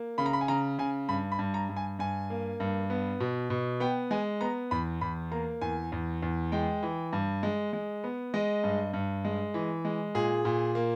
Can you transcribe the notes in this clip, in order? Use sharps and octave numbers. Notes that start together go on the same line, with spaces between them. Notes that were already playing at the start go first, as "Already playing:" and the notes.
Already playing: A#3
C#3 B5
A#5
B5
G#5
C#3 A#5
C#3 G#5
G2 B5
B5
G2
A#5
G2
G#5
G2 G#5
A#3
G2
B3
B2
B2
B3 G5
G#3 G#5
B3 A#5
E2 B5
E2 B5
A#3 A#5
E2 G#5
E2
E2
G#3 G5
E3
G2
G#3
G#3
B3
G#3 D#5
G2
G2
G#3
E3
G#3
A#2 G#4
A#2
A#3